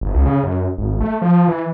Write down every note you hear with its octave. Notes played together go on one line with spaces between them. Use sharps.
G1
C#2
C#3
F#2
G#1
A3
F3
E3